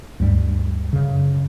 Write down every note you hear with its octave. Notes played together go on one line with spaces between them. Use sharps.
D2 G2 G3
F#2 C#3